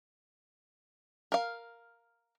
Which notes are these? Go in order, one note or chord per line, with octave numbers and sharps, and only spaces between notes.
A#4 F5